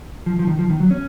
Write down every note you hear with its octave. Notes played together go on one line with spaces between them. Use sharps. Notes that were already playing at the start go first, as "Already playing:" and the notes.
F3
F3
D#3
F3
D#3
F#3
C#4